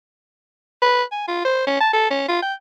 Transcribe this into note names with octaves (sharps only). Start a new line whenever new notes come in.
B4
G#5
F4
C5
C#4
A5
A4
C#4
F4
G5